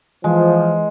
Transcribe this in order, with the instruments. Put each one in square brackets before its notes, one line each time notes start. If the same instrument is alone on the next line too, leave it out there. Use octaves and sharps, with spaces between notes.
[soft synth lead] E3 [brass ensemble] F3 [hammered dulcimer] G#3